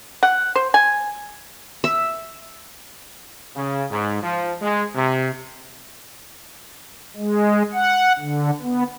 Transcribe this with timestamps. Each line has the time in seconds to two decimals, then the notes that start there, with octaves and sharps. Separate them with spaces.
0.23 F#5
0.56 C5
0.74 G#5
1.84 E5
3.56 C#3
3.90 G#2
4.22 F3
4.62 G#3
4.95 C3
7.16 G#3
7.73 F#5
8.19 D3
8.62 B3